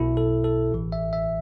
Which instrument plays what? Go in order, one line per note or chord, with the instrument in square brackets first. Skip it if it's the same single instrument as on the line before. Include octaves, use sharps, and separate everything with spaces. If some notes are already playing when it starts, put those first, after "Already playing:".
Already playing: [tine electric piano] B1 B2 E4
A4
A4
A1 A2 E3
E5
E5